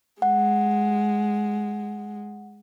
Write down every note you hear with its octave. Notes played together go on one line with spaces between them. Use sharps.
G#3 F#5